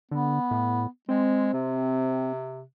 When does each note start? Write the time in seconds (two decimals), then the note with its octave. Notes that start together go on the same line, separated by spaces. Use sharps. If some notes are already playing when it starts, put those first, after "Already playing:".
0.11 D3 B3
0.51 A2
1.09 G#3 C4
1.53 C3